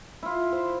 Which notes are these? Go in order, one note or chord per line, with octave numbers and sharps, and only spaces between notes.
E4 F4
C5